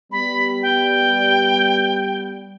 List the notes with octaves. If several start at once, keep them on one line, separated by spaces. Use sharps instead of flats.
G3 B3 B5
G5